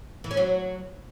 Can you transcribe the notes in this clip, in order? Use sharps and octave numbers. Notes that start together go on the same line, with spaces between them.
E3
C#4
F#3